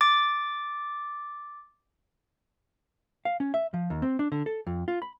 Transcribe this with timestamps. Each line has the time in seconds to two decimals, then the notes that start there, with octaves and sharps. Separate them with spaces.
0.01 D6 A6
3.25 F5
3.40 C#4
3.54 E5
3.74 F3
3.90 D#2
4.02 C4
4.19 D4
4.32 D3
4.46 A4
4.67 F2
4.88 F4
5.02 B5